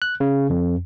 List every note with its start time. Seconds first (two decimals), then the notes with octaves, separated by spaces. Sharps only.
0.02 F#6
0.20 C#3
0.50 F2